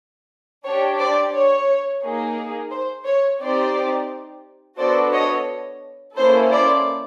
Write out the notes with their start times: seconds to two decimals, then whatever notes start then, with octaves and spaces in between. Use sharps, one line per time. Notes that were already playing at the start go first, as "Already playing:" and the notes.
0.65 D4 G4 C#5
0.98 C5 D5
1.33 C#5
2.02 A#3 D#4 G#4
2.71 C5
3.05 C#5
3.40 C4 D#4 G4 C5 D5
4.78 B3 D4 F#4 A4 C5 D5
5.12 C#5 D#5
6.16 A#3 C#4 E4 A4 C5
6.51 C5 D5